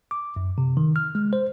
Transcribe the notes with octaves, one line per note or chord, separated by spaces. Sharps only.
D6
F#2
C3
D#3
F6
G#3
C5